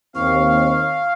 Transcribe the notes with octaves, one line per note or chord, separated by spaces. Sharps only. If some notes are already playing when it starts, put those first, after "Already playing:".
D#2 C4 F5 C#6